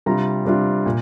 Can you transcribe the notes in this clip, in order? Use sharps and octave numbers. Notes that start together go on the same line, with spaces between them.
C3 G3 D4 F4 A#5
C3 G3 D4 F4
A#2